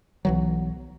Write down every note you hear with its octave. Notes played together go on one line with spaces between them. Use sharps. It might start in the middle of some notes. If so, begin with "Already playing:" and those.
B1 E3 F#3